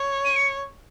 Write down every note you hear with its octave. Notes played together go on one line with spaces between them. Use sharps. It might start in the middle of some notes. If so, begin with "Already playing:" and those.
Already playing: C#5
D#7
C#7